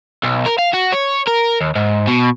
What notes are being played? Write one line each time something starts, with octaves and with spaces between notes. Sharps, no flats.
B1
A#4
F5
F#4
C#5
A#4
D#2
G#2
B2